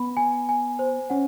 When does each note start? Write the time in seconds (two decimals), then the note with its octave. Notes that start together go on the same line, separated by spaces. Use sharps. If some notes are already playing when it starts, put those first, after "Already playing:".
Already playing: B3 B5
0.17 G#5
0.49 G#5
0.79 C5
1.10 C#4 F#5